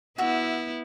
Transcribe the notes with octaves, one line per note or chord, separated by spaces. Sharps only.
B3 E4 F#4 E5